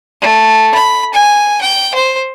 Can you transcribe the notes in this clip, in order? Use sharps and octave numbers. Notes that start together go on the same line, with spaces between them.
A3
B5
G#5
G5
C5